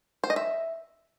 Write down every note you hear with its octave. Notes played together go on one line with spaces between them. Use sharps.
C5
D#5
E5